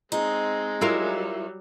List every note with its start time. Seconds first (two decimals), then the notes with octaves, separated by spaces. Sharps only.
0.12 G#3 C4 D#4
0.81 F#3 G3 E4 F4 A#4